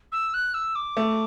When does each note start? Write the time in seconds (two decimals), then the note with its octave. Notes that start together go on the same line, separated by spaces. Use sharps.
0.12 E6
0.34 F#6
0.54 E6
0.75 D6
0.97 A3